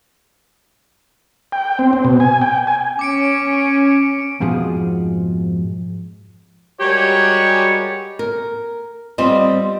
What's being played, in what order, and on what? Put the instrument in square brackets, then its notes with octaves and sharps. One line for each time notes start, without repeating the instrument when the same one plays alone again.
[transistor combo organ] G5
C4
C4
B2
G#5
G5
G#5
[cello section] C#4 [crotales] D6 C#7 D7
[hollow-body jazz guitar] F2 G#2 B2 F3 F4 G#4
[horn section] G3 G#3 F#4 G4 A#4 C#5
[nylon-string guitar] A#4
G3 C4 F4 C5 D#5